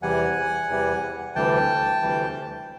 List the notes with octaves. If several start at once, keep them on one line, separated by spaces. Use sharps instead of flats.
E2 C3 E3 G3 F#5 G#5
E2 C3 E3 G3
D2 C3 E3 G3 G5 A5
D2 C3 E3 G3